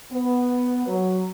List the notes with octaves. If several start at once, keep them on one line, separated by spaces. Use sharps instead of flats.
B3
F#3